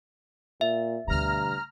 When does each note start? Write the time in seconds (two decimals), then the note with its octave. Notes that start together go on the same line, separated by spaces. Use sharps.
0.61 A#2 E5
1.07 D2 G2 B2 A#5 F6